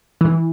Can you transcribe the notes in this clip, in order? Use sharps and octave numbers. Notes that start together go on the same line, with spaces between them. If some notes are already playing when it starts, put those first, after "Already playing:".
E3